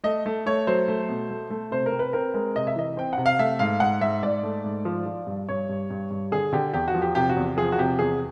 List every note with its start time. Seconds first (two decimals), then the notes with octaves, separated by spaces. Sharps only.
0.04 A3 D#5
0.26 A3
0.46 A3 C#5
0.67 F#3 C5
0.88 A3
1.09 B2
1.30 A3
1.50 A3
1.71 C3 C5
1.86 A#4
1.92 C4
1.99 B4
2.13 C4 A#4
2.34 G#3 A#4
2.55 C3 D#5
2.67 E5
2.76 E3 D#5
2.97 C4 G5
3.13 C3 F#5
3.26 F5
3.39 A3 E5
3.59 G#2 F5
3.80 G#2 F#5
4.01 G#2 E5
4.23 G#2 D5
4.43 A3
4.64 G#2
4.85 F3
5.06 F3
5.27 G2
5.49 G2 C#5
5.69 G2
5.90 G2
6.10 G2
6.32 D3 G#4
6.53 D3 G4
6.73 E2 G4
6.88 F#4
6.95 F3
7.02 G4
7.15 C3 G4
7.29 F#4
7.37 E2
7.57 F3 G#4
7.72 F#4
7.79 C3 G4
7.99 E2 G#4